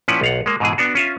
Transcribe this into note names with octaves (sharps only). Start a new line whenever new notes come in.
A#2 F3 C#4 E4 B4 F#5
B1 F5 F#5
G#3 A#3
G#2 B2 E3 G#4
B3 D4 F#4
C#4 F4 E5